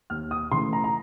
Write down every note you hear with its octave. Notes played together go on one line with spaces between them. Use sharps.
D#2 F6
D#6
C#3 E3 A3 C6
A#5
A#5